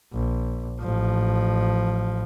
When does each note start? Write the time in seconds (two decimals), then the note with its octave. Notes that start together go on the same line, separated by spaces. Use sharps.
0.13 A#1
0.80 A1 F3